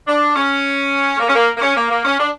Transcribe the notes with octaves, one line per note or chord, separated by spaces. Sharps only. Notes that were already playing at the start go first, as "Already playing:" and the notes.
D4
C#4
A3
A#3
C#4
A#3
A#3
C#4
A#3
A#3
C#4
D4